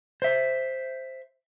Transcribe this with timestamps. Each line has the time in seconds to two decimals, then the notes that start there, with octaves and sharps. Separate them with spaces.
0.22 C5 E5